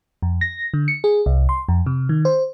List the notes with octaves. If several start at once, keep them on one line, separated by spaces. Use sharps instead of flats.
F2
A#6
D3
C#7
G#4
C2
C6
F2
C3
D#3
C5